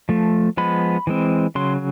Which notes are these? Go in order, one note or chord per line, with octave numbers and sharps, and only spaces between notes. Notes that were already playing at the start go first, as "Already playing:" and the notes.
F3 A3
F3 G#3 B3 B5
E3 G#3 C4
C#3 F#3 C6